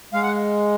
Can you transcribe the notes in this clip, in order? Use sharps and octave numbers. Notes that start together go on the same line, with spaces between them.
G#3 F5
F#5